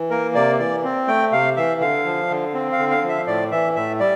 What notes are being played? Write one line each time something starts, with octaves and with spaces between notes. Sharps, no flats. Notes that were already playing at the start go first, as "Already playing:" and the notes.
Already playing: E3
A#3 A#4
C3 D5
E3 D5
C4
A3 G5
C3 F5
E3 E5
D3 F5
F3
D3
C4
F5
D3
F5
F3
E5
A2 D5
E3 E5
A2 E5
G3 D5